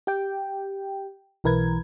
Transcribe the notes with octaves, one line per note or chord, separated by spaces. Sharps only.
G4 G5
B1 E3 A#4 B4 G#6